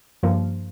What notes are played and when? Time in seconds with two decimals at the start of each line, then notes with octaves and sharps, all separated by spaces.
0.23 G2 F3 A#3